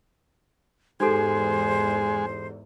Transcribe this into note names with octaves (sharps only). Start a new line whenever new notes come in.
E2 G#2 G#3 D#4 G4 A4 C5